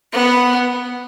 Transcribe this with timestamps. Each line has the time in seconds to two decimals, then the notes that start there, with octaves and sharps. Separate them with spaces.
0.13 B3